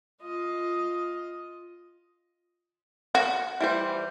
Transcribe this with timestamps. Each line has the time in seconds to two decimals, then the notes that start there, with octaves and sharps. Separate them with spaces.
0.23 F4 D#5
3.15 F#4
3.61 E3 G3 C5